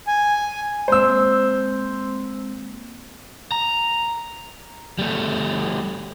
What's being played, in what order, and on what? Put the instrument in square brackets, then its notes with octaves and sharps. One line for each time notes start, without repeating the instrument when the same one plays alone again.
[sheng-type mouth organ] G#5
[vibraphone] G#3 A#3 C4 [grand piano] C5 E6
[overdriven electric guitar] A#5
G3 A3